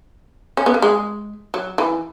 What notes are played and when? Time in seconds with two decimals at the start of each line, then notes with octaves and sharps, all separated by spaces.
0.57 C#4
0.66 B3
0.74 A#3
0.82 G#3
1.54 F#3
1.78 E3